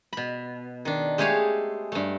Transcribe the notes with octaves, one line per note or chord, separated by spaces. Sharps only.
B2 B5
D#3 D4
G#3 A3 G4 G#4 C#5 F5
G2 A3